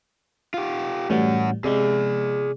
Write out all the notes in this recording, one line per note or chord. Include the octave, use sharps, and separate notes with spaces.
F4 G4
A2 E3 G3 C#4 F#4
C3 G#3 G#4 D5